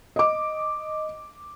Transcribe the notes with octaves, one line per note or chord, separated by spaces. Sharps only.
D#5 D6